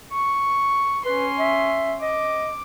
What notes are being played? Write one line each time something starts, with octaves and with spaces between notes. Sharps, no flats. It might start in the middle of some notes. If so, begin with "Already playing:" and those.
C#6
C#4 B4 C6
E5
D#5 D6